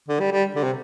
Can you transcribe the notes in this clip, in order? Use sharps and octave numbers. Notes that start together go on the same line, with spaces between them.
D3
G3
G3
D3
C3